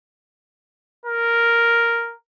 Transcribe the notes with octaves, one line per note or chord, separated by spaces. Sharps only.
A#4